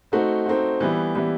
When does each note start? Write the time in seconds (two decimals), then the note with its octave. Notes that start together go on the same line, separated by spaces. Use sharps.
0.12 A3 C4 D#4 F#4
0.46 A3 C4 D#4 F#4
0.80 E3 G3 B3 E4
1.15 E3 G3 B3 E4